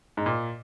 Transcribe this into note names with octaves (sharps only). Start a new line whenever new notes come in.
G#2
A#2